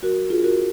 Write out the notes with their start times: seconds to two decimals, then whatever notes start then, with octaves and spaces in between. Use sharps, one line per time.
0.03 F#3 F#4 A#4
0.30 D4 F4 G#4
0.44 F#4 A#4